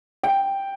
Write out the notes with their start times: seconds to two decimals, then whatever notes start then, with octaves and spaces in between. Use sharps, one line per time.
0.23 G5